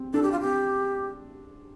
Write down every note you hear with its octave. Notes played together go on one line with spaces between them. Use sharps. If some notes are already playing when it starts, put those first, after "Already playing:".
Already playing: C4
D4 A4
G4
F4
C4 G4